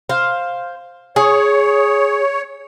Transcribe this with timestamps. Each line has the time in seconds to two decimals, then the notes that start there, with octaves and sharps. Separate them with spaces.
0.09 C5 F5
1.16 G#4 C#5